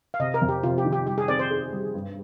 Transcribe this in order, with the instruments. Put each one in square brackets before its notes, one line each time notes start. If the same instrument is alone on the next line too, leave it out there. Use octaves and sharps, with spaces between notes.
[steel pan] F5
[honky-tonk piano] C3 [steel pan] D#5
[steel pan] A#4
[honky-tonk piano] F2
[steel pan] G4
[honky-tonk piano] C3 [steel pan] F4
[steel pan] G4
[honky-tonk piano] D#3
[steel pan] G4
[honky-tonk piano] G3 [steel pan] G4
[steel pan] G#4
[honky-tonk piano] C4 [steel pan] D5
[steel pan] C5
[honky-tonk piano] G#4
G3
G2